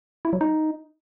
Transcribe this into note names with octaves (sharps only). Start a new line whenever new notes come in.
E4
F#3
D#4